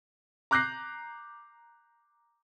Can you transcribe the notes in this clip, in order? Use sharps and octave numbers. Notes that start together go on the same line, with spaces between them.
A#5 D6 F#6 G6 A#6 C7